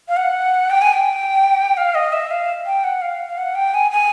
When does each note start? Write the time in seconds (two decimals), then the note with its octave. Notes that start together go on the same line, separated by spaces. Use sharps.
0.08 F5
0.17 F#5
0.71 G5
0.82 G#5
0.93 G5
1.77 F5
1.95 D#5
2.13 E5
2.31 F5
2.66 G5
2.84 F#5
3.02 F5
3.27 F5
3.38 F#5
3.55 G5
3.74 G#5
3.91 G#5